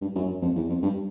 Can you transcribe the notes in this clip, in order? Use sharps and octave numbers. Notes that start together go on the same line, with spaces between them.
G2
F#2
F#2
F2
E2
F2
G2